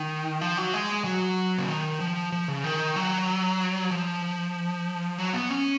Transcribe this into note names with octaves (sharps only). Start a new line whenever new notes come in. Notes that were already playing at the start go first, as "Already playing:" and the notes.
Already playing: D#3
F3
F#3
G#3
F#3
C#3
D#3
F3
F3
C#3
D#3
F#3
F3
F#3
B3
C#4